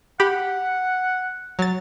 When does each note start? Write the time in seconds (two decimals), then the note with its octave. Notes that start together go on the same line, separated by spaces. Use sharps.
0.20 G4 F#5 B5
1.59 F#3 A6